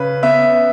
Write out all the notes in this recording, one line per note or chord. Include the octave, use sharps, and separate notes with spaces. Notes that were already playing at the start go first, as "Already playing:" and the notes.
Already playing: C#3 B4
B3 E5